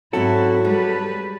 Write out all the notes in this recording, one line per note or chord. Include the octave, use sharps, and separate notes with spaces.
G#2 F#3 C4 E4 F#4 A4 F#5
G3 G#3 B4